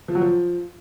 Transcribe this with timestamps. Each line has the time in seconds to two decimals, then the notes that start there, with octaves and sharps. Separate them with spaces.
0.08 F3
0.15 F#3
0.22 F3